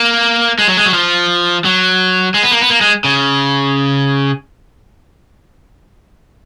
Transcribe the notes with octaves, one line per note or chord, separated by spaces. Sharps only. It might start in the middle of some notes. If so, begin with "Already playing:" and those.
Already playing: A#3
G#3
F#3
G#3
F#3
F3
F#3
G#3
B3
A#3
B3
A#3
G#3
C#3